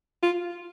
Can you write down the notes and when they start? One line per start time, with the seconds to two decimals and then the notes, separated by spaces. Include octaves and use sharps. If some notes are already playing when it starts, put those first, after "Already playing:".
0.23 F4